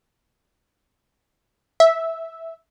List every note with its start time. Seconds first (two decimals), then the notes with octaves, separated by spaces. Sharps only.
1.80 E5